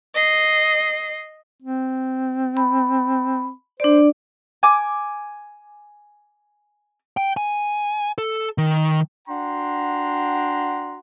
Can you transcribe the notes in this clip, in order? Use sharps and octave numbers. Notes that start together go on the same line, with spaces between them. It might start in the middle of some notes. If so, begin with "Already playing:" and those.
D#5 C7
C4
B5
D4 C5 D5
G#5 D6
G5
G#5
A4
D#3
D4 F#4 F#5 G5 A#5 C6